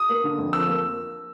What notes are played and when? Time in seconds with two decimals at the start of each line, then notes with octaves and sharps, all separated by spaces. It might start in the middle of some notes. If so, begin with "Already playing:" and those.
Already playing: D#6
0.09 A#3
0.24 D3
0.38 F2
0.53 F3 E6
0.68 A#3